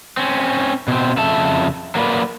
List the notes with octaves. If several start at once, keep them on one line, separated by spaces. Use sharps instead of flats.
C4 C#4
B2 C4
F2 C#3 E5 A5
F#3 A#3 B4 D5